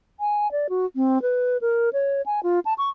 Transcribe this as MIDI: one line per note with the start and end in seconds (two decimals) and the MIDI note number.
0.20 0.51 80
0.52 0.67 74
0.69 0.86 66
0.96 1.21 60
1.22 1.57 71
1.61 1.89 70
1.93 2.22 73
2.26 2.40 80
2.43 2.60 65
2.65 2.74 81
2.78 2.90 85